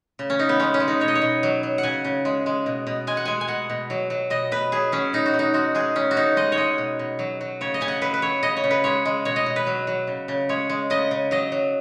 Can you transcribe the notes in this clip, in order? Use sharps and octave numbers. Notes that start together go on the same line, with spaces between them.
C#3
C#4
C#3 D#4
B3
G#3 C#4
C#4
G#3
D#4
B2 C#5
D#5
C#5
B2
F#3
F#3
F#5
C#3 G#5
C#3
G#3
G#3
B2
B2
G#3 G#5
F#5
G#3 G#5
G#5
B2 F#5
B2
F#3
F#3
B2 D#5
B2 B4
F#3 G#4
F#3 C#4
B2 D#4
F#4
B2
D#4
G#3 F#4
G#3 G#4
C#3 C#4
F#4
C#3 D#4
G#3 D#5
C#5
G#3 D#5
B2
B2
F#3
F#3
C#3 C#5
D#5
C#3 G#5
F#5
F#3 B4
B4
F#3 C#5
C#3 D#5
C#5
C#3
B4
G#3 C#5
G#3
B2 C#5
D#5
B2
B4
F#3
F#3
C#3
C#3
G#3 C#5
G#3
C#3 D#5
C#3
F#3 D#5
F#3